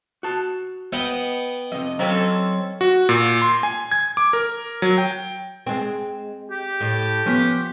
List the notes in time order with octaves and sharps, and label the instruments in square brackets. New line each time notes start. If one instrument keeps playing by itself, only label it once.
[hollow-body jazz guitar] F#4 A5
[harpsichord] B3 F#5 G5 [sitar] D#5
[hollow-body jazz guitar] F2 C3 [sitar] D#5
[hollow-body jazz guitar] F#3 F5 A#5 [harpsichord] C4 [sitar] C#4 A4
[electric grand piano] F#4
A#2
C6
G#5
G#6
D6
A#4
F#3
G5
[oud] G#3 C4
[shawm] G4
[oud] A2
[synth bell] F3 B3 [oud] C#4